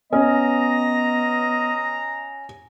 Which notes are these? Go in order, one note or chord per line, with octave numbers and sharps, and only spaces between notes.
B3 C#4 D#5 A#5